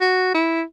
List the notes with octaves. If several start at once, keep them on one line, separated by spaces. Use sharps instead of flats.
F#4
E4